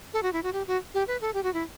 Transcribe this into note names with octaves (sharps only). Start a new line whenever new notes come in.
A4
F#4
E4
F#4
G4
F#4
G4
B4
A4
G4
F#4
E4